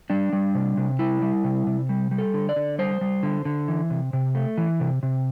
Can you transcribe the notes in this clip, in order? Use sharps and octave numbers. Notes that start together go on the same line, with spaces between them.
G3 D4
G3
C3
C3
G3 E4
G3
C3
C3
G3
G3
A4
D3
D5
D3
G3 C5
G3
D3
D3
E3
C3
C3
A3
E3
C3
C3